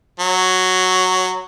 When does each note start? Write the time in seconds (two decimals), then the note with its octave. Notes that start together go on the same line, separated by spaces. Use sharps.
0.20 F#3